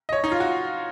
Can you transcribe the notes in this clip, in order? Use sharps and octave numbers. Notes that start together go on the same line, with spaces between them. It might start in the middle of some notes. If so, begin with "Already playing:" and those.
D#5
C#5
D#4
F4
F#4